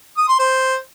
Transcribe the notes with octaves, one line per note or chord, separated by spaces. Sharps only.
D#6
C6
C5